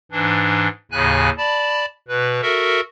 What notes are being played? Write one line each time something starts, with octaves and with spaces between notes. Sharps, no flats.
G#2 E3 D4
D#2 A2 C#3 G#5 F#6
D5 A5 B5
B2 B4
F#4 A4 A#4 E5